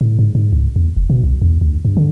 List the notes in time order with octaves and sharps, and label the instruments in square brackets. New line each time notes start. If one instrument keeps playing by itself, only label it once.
[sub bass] A2
G#2
G#2
C#2
E2
F1
B2
C2
E2
D2
G2
D3